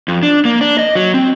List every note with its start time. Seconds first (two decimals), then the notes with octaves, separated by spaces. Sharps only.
0.08 F2
0.23 D4
0.45 A#3
0.61 D4
0.79 D#5
0.95 F#3
1.14 C4